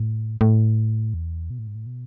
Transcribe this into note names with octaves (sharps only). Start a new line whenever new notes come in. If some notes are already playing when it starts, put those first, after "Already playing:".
Already playing: A2
A2
E2
B2
A2
G#2
A2
B2